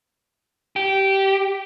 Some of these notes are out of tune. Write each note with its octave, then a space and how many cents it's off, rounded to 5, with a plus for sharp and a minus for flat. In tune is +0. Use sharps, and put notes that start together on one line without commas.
G4 -15